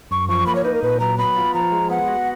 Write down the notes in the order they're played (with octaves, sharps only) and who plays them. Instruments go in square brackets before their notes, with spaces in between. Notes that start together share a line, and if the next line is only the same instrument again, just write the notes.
[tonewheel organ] F#2 [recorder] C#6
[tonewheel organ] F3 [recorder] C#6
[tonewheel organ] A#3 [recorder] B5
[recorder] C#5
[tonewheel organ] D#4 [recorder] B4
[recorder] A#4
[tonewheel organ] A#2 [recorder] B4
[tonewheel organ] F#3 [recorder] A#5
[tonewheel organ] B3 [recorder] B5
[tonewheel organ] F4
[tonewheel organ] F3 [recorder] A#5
[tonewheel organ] G#3
[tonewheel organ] B3 [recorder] F#5
[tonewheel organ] F#4